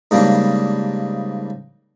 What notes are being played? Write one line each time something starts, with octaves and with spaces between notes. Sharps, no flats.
G#2 C#3 G3 A#3 D4